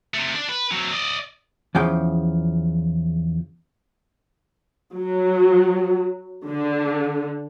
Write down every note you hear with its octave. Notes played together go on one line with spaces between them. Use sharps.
C3 A3
D4 D5
B4
F#3 C4
D5 D#5
E2 C#3 F3 G5
F#3
D3